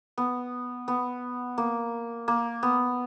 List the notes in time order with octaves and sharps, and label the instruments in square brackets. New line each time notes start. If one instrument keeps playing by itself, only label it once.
[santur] B3
B3
A#3
A#3
B3